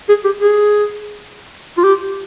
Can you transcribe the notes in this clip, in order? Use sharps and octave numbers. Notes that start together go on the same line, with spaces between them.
G#4
G4
G#4
F4
G4